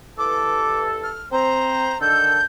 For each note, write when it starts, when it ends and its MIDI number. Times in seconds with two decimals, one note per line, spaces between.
0.18 1.18 43
0.18 1.18 52
0.18 1.18 69
0.18 0.81 86
1.03 1.26 89
1.32 1.93 60
1.32 1.93 72
1.32 2.00 82
2.01 2.39 50
2.01 2.39 51
2.01 2.39 69
2.01 2.44 91